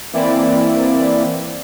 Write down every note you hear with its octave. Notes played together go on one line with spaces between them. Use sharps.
E3 A#3 C4 E4 D5